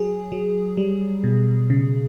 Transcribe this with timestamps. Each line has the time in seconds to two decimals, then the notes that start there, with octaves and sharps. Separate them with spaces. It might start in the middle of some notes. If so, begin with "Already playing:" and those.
Already playing: F#3 G#4
0.32 F#3
0.77 G3
1.24 B2
1.70 C#3